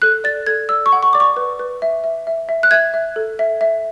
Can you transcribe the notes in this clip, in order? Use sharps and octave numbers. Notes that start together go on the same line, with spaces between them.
A4 F#6
D5 A6
A4 G#6
D5 E6
C#6
F#5
C#6
D5 D6
C#6
B4
B4
E5
E5
E5
E5
F#6
E5 G#6
E5
A4
E5
E5